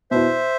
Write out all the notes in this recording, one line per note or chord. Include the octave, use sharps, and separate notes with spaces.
B2 B3 E4 C5 E5